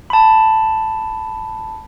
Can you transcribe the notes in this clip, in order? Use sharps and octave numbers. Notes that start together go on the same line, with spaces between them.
A5 B5